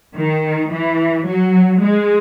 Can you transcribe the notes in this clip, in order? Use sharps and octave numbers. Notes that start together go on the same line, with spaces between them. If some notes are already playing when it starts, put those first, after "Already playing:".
D#3
E3
F#3
G#3